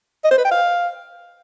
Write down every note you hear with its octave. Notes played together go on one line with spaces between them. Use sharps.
D#5
C5
B4
G5
F5